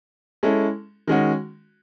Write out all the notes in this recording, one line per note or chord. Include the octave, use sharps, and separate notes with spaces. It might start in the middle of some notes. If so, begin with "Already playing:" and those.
G#3 C#4 E4 A4
D#3 G#3 C#4 F#4